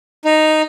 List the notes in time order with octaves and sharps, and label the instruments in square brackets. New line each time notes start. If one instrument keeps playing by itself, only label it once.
[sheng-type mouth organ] D#4